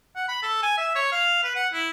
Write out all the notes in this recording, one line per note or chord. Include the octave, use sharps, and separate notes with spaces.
F#5
B5
A4
G#5
E5
C#5
F5
B4
F#5
E4